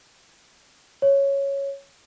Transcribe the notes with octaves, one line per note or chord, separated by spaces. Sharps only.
C#5